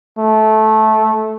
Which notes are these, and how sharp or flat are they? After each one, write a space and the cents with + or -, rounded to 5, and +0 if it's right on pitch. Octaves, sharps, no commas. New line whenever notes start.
A3 -15